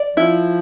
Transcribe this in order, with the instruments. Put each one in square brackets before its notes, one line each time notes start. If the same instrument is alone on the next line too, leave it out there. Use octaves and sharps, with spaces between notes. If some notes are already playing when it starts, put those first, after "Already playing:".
Already playing: [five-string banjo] D5
[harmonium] F3 [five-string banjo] E4